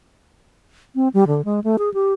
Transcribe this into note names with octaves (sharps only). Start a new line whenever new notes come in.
C4
G3
D3
G#3
A3
G#4
G4